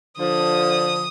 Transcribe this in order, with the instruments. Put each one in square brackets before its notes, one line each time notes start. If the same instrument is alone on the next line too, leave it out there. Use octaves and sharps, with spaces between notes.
[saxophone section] D3 F3 [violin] D#6